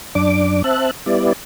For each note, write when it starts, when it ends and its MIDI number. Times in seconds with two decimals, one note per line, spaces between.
0.15 0.62 42
0.15 0.62 62
0.15 0.62 86
0.64 0.91 60
0.64 0.91 76
0.64 0.91 81
0.64 0.91 90
1.06 1.33 55
1.06 1.33 59
1.06 1.33 64
1.06 1.33 74